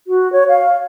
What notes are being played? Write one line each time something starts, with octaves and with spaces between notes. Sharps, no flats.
F#4
C#5
F5